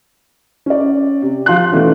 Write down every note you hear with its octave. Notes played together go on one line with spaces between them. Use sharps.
C#4 D5
C3
F3 F5 C6 F#6
B2 D#3 E3 A3 C#4